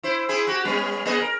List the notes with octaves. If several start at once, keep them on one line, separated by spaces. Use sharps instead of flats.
E4 C5
C4 E4 G#4
F#4 G4
G3 B3 C#4
A#3 G#4 D#5
A#4